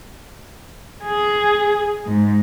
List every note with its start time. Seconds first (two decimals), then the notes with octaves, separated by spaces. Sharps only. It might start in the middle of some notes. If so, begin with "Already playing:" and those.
1.04 G#4
2.06 G#2